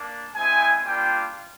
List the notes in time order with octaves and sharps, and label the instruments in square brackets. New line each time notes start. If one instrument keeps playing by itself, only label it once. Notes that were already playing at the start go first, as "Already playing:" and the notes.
Already playing: [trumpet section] A#3 D4
G#3 C4 E4 G#5
G3 A#3 D4 F4 G5